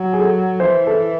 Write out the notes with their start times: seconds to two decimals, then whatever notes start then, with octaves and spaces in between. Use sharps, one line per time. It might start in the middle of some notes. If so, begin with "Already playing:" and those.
Already playing: F#3
0.13 G#4
0.19 A4
0.60 E3 C5
0.87 A4